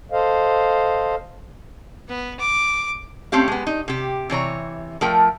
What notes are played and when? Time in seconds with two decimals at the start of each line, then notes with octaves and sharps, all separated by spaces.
0.12 A4 C5 D#5 F5
2.08 B3
2.39 D6
3.32 A3 C4 C#4 G4 F5
3.48 G#3 B3
3.67 D#4
3.88 C3 G4
4.30 C3 E3 C#5 A#5
5.01 F3 A3 A#4 G5